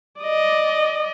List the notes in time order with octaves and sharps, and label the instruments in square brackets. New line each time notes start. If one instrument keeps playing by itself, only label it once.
[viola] D5 D#5